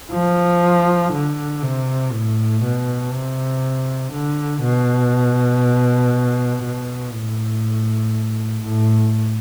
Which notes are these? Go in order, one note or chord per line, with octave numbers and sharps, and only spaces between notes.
F3
D3
C3
A2
B2
C3
D3
B2
B2
A2
A2